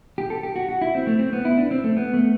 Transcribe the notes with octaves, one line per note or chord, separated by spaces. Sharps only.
G4
A4
G4
F#4
F#4
E4
C4
A3
C4
B3
E4
D4
C4
A3
B3
A3